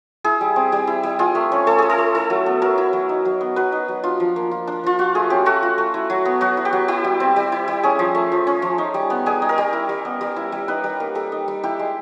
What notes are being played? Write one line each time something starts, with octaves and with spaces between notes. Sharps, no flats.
E4 G#4
G3
C4
G3
E4
G3
F4 G#4
A3
C#4
A3 A4
F4 G#4
A4
A3
E4 A4
F#3
B3
F#3 A#4
E4
F#3
D#4
F#3
B3
F#3 B4
D#4
F#3
D4 F4
F3
A#3
F4
D4
F3 F4
F4 F#4
A3 G#4
C#4 G4
A3 F#4
F4
A3
E4
F#3
B3
F#3 F#4
E4
G4
F#3
E4 G4
G3
C4
G3
E4
G3
C#4 G#4
F3
A3
F3
C#4
F3
D#4
G3
B3
G3 G#4
D#4
A#4
G3
E4
G3
B3
G3
E4
G3
D#4 B4
G3
A#3
G3 A4
D#4
G3
E4 G4
G#3